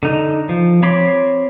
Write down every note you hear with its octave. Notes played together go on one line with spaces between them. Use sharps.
D3 D#4
F3
C4 C#5 B5 C6 D6